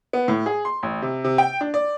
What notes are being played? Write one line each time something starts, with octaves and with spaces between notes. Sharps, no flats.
B3
A2
G#4
C6
A1
C3
C3
G5
D4
D5